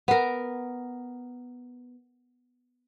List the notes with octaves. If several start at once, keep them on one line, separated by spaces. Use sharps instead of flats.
B3 A#4